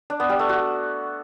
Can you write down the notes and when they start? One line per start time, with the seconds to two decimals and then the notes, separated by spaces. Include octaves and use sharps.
0.10 D4
0.20 B3
0.30 G3
0.39 A3
0.49 F#4